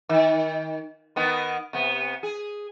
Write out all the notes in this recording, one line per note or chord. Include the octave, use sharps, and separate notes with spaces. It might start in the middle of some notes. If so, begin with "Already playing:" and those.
D#3
D#3 B3
C3 B3
G#4